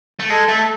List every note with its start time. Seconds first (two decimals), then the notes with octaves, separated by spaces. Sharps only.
0.20 A3
0.30 G#3 A4
0.49 A3